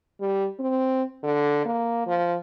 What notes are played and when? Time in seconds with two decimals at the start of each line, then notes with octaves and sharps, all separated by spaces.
0.20 G3
0.60 C4
1.23 D3
1.65 A#3
2.07 F3